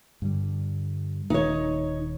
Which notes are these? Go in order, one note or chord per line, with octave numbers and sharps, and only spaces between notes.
G2 D3 G3
D#1 D#3 D#4 C#5